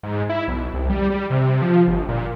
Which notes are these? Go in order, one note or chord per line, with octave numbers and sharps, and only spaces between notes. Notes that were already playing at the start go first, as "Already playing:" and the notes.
G#2
E4
B1
C2
G3
G3
C3
F3
G1
A#2